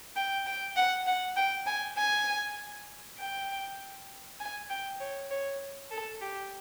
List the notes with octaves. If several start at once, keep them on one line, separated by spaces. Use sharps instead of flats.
G5
G5
F#5
F#5
G5
G#5
G#5
G5
G#5
G5
C#5
C#5
A4
G4